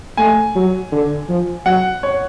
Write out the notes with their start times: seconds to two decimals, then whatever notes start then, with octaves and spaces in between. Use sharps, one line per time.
0.17 A3 G#5
0.55 F#3
0.92 D3
1.29 F3
1.66 F#3 F#5
2.03 C#5